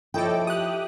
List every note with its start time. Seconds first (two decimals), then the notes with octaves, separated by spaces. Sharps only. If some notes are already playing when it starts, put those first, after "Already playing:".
0.14 F3 E4 A4 C#5 D#5 G5 D6
0.47 G4 D#6 F#6